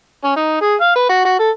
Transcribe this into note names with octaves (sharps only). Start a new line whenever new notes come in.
C#4
D#4
G#4
F5
B4
F#4
F#4
A4